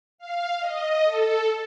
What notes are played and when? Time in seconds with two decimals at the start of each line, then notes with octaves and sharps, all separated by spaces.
0.18 F5
0.59 D#5
1.05 A4